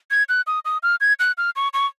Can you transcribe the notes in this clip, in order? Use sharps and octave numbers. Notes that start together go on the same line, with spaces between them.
G#6
F#6
D#6
D#6
F6
G#6
F#6
F6
C#6
C#6